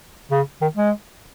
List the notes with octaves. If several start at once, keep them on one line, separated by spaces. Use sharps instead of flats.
C#3
D#3
G#3